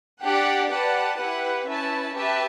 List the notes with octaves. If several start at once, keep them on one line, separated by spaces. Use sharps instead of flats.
D4 G4 D5 F#5
G4 B4 D5 F#5 A5
E4 G4 B4 F#5
C#4 E4 B4 E5 A5
G4 B4 E5 A5